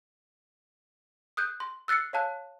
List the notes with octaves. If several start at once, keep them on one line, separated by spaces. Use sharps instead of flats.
D#6 F#6 G6
C6
E6 F#6 A6 C7 C#7
C#5 F5 A5 F#6